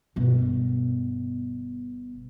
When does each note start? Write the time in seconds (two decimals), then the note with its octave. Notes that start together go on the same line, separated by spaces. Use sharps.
0.16 G1 B2